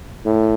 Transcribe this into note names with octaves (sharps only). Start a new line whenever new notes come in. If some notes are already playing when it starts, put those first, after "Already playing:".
A2